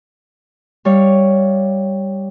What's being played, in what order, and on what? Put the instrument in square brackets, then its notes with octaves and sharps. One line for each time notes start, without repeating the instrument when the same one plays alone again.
[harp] G3 C#5 F5